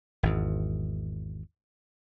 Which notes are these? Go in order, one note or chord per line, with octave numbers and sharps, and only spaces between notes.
G#1 E2